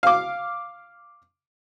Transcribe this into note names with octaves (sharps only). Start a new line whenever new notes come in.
F5 D6